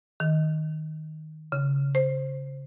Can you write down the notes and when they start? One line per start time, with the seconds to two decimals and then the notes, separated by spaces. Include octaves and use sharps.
0.20 D#3
1.52 C#3
1.95 C5